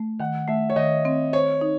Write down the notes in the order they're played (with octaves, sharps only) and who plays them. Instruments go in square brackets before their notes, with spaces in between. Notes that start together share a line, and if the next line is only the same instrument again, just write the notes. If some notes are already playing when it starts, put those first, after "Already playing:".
Already playing: [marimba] A3
[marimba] D#3 [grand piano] F#5
[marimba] A3 [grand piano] E5
[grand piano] C#5
[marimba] D#3 [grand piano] D#5
[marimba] C4
[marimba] C5 [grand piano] C#5
[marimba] D#4